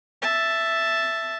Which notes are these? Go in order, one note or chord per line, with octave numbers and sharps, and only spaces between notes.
E5 A5